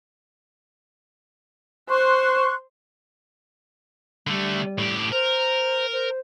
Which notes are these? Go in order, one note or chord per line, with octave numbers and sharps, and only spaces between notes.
C5 C6 C#6 F#6
D3 G3 A3
A2 G4
A#4 C5
C5